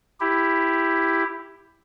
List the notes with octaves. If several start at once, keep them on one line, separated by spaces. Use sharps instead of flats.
E4 G4